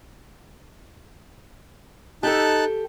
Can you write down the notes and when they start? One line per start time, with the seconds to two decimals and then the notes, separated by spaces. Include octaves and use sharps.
2.23 D#4 G4 A4 A5 F#6